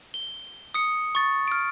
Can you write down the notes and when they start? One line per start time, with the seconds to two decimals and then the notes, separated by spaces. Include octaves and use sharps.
0.14 G7
0.74 D#6 C#7
1.15 C#6 A6
1.48 F6 D7